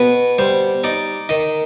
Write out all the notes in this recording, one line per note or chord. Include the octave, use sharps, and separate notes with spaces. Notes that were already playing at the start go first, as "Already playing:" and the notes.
Already playing: B2 B4
G3 C5
D#4 D5
D#3 D#5